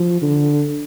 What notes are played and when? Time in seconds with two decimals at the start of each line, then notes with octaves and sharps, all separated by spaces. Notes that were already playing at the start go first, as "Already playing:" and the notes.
Already playing: F3
0.22 D3